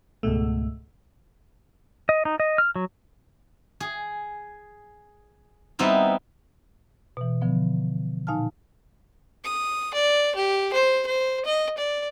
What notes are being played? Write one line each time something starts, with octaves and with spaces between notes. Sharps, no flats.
C#2 G#2 B2 A3
D#5
D#4
D#5
F6
F#3
G#4
G3 B3 C4 D#4 E4
B2 E3
D3 F3 B3
A#2 D#4 F5 G#5 A5 F6
D#6
D5
G4
C5
C5
D#5
D5